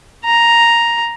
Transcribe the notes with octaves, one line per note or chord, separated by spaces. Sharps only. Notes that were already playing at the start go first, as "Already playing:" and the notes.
A#5